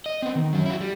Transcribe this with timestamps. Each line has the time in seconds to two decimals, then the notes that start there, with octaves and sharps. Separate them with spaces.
0.06 D#5
0.22 B3 C4
0.35 D#3
0.53 F#3 C#4
0.66 E4 F#4
0.81 G3